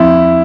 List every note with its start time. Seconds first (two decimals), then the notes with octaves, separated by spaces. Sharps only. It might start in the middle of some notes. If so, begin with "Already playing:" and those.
Already playing: E2 F3 C4 E4